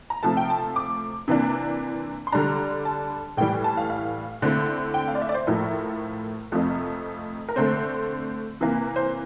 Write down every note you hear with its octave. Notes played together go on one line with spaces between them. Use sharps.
A#5
C3 F3 A3 A5
G5
A5
D6
C3 E3 A#3 D4
C6
D3 G3 D4 A#5
A5
A2 E3 G3 G5
A5
F5
F5
D3 A3 C4 E4
G5
F5
D5
E5
D5
C5
A2 F3 A3 E4 A#4
F2 C3 F3 A3
A#4
D3 A3 C4 C5
C3 E3 A#3
C5